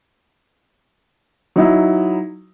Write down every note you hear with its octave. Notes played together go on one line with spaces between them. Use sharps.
F#3 D#4 E4